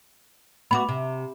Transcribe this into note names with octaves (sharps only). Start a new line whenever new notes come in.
B3 F#4 B5 D6
C3